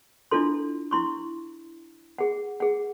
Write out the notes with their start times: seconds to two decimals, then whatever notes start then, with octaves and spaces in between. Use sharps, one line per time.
0.31 D4 E4 F4 A4 C6
0.91 E4 C6 C#6
2.18 G#4 F#5
2.60 G#4 F#5